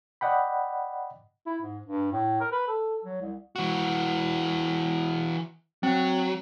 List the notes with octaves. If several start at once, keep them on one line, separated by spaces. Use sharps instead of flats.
D5 D#5 F#5 G5 B5
E4
G#2
G2
A2
A#4
B4
A4
F#3
C2
E3 F#4
F#3 C4